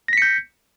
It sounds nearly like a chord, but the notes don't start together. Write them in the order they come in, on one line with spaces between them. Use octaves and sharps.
A#6 B6 C#7 G6